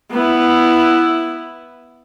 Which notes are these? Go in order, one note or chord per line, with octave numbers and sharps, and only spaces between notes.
B3 E4